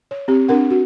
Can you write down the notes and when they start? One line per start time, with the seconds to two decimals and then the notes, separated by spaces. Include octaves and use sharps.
0.11 C#5
0.28 C4 G4
0.48 C4 D4 A#4 F#5
0.70 F#4